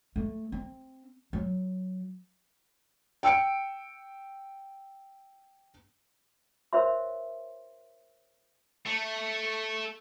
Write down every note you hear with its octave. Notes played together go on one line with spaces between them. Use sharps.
A3
C4
F#3
G5 E6 C#7 D7
A#4 C5 C#5 E5 C6
A3